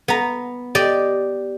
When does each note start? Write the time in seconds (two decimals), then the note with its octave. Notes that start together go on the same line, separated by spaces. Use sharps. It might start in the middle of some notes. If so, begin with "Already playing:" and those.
0.08 B3 A#5
0.75 G4 D5 D#5